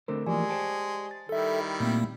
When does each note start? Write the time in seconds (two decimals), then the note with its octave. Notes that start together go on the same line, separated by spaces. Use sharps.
0.08 D3 A3 C4 A#4 C5
0.27 E3 F3 G#3 A#3 G4 D5 G#5
0.49 C5 G5 A5
1.11 A6
1.29 D#3 G3 E4 A4 E5
1.80 A#2 A3 A#3 C4